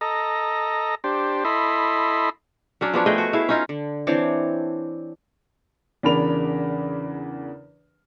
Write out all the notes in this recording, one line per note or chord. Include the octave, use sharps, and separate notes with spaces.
A4 D#5 A#5
D4 G4 C5
E4 A4 D#5 B5 C6
F#3 C#4 D4
F3 B3 D4 C#5
A3 G#4 D#5 G5
F#4
E4 G#4 E5 F5
C#4 D#4 F4
D3
E3 C4 D4 C#5
E2 C#3 D4 A#4 B5 F7